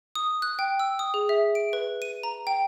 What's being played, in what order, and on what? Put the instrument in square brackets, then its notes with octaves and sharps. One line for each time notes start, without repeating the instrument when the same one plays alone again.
[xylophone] D#6
F#6
G5
E6
D#6
G#4
E5
D7
B4
D#7
A#5
G5